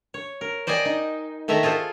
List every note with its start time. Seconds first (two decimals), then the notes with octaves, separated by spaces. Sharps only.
0.14 C#5
0.41 A#4
0.67 C5 D5 D#5 G5 G#5
0.85 D#4
1.48 D#3 A3 E5 G#5 A#5
1.63 F4 G#4 A4 C5